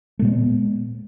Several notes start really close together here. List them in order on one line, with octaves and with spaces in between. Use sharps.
A3 A#2 G#3 B3